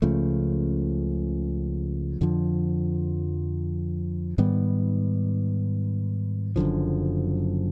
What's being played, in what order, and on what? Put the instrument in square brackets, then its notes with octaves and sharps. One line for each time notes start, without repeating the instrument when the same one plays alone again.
[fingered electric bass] C#2 C#3 F3 A3
F2 D3 F3
G#2 D#3 G3 B3
F#1 F#2 D3 F3